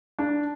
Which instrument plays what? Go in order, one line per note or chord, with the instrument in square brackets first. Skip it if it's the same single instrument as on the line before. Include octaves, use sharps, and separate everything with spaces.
[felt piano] D4